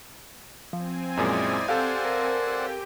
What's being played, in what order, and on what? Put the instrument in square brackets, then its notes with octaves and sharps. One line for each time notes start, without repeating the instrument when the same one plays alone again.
[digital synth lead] F3 [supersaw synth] C4 G#5
[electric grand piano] F#2 A#2 G#3 [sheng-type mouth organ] E4 D5 D#5
[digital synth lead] G4 [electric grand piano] A4 F5 [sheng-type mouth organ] C5 D5 F#5
[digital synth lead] A#4
[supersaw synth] G4 G5